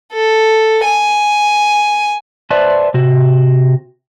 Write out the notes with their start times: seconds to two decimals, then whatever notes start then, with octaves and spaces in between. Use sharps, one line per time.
0.13 A4
0.85 G#5
2.50 B4 C5 D5 E5 A5
2.94 C3 F#4